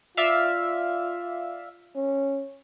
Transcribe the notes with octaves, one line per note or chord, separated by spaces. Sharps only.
F4 D5 E5 F5
C#4